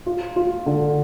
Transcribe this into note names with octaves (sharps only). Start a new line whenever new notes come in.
F4
F4
D3